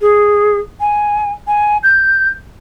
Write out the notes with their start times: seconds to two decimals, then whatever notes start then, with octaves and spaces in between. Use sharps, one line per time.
0.01 G#4
0.80 G#5
1.47 G#5
1.83 G6